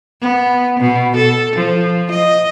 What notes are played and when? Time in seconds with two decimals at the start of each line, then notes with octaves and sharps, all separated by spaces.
0.21 B3
0.80 B2
1.16 A4
1.56 F3
2.11 D#5